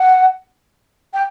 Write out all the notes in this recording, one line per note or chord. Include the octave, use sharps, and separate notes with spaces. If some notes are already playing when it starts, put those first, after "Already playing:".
Already playing: F#5
G5